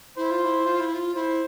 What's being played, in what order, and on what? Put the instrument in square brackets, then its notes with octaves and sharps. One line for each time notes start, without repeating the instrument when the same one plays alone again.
[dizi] E4 [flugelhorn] C5
[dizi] F4
E4
F4
E4
F4
[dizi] E4 [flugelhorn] C5